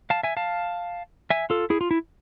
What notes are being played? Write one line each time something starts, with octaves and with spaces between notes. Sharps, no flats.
F5 A5
E5 G#5
F5 A5
E5 G#5
F4 A4
E4 G#4
F4
E4